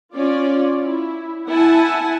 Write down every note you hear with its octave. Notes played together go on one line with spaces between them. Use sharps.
C#4 F4 D5
E4
E4 F#5 G#5 A5